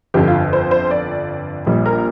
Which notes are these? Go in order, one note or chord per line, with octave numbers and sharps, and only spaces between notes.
G1 F2 D3 G4
F4
C5
C5
D5
A#1 A#2 G3
A#4